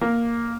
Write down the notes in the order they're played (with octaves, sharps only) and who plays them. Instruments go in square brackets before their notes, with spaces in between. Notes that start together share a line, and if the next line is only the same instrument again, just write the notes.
[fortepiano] A#3